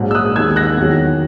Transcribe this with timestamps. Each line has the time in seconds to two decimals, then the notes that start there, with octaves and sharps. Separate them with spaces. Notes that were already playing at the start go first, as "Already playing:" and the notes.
Already playing: A#1 G#2 F#3
0.11 E6
0.15 D#6 F#6
0.36 D#2 D#3 G#3 E6 G#6
0.56 F#6 A#6
0.77 E2 D#3 F#3